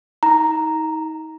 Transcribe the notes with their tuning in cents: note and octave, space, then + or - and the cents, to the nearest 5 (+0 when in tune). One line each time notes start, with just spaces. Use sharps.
D#4 +35 A#5 +0